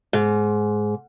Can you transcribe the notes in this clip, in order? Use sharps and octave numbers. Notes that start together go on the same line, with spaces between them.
G#2